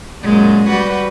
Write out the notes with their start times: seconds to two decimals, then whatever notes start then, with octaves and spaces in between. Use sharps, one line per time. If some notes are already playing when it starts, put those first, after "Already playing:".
0.22 F#2 A#2 G#3
0.68 G3 F#4 B4